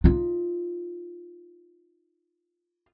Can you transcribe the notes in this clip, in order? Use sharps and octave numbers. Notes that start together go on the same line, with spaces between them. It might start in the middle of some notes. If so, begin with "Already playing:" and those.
D#4 F4